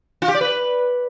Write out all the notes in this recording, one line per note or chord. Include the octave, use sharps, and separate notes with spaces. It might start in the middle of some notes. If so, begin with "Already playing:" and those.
F4
G4
D5
B4